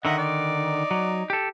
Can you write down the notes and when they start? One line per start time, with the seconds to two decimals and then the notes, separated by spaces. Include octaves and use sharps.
0.05 D3 D#3 D#5 E5 F#5
0.18 D#4 D5
0.91 F#3
1.30 G4 A4